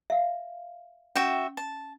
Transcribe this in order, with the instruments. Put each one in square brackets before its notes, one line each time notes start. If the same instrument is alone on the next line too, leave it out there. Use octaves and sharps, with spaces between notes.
[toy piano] E5 F5
[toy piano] C#4 [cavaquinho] F#4 E5 G5
[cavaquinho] A5